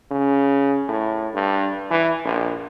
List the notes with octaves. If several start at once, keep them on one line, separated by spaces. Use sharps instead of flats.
C#3
A2
G2
E3
A#1